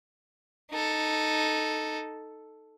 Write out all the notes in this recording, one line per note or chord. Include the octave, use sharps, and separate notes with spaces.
D#4 A4